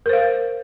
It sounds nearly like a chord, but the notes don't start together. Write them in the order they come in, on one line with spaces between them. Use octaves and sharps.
A#4 C5 F5